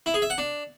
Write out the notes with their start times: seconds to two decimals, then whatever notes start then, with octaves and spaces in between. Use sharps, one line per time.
0.06 E4
0.14 G#4
0.22 E5
0.30 F#5
0.38 D4